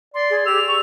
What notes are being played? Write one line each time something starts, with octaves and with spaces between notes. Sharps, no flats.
D5 C6
G#4
G4 E6 F7
C#6